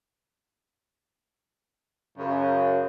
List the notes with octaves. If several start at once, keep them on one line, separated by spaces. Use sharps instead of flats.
F#2 C#3